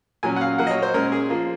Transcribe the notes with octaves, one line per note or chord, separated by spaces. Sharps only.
A#2 F#3 C#4 G#5
F#5
F5
A#2 F#3 A#3 F#5
D#5
C#5
C5
A#2 G#3 C#4 A#4
G#4
F3 A#3 F4